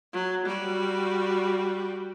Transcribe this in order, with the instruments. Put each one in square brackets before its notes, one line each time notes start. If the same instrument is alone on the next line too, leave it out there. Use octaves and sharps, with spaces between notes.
[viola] F#3
G3 F#4